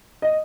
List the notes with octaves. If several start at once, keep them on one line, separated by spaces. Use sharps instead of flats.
D#5